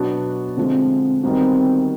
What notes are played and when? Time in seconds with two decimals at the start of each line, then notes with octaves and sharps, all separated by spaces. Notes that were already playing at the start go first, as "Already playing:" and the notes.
Already playing: B2 F#3 B3 D4 F#4
0.57 D3 F3 G#3 C4
1.23 D#3 G3 B3 C4 D#4 F#4